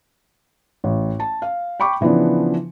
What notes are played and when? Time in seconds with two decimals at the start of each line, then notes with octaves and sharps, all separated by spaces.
0.84 A1
1.20 A5
1.42 F5
1.80 G5 B5 C#6 D6
2.01 C#3 E3 F3 B3 D4